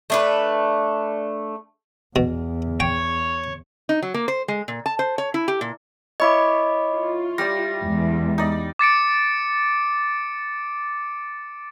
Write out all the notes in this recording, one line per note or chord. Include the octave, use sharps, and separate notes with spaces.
A3 D4 B4
E2 B2
C#5 G5
D#4
F#3
A#3
C5
G#3
A#2
A5
C5
C#5
E4
G4
A#2
E4 C#5 D#5 B5 D6
F4
G3 G4 D5 A#6
E2 G#3
D#4 D5
D6 A6 C#7 D7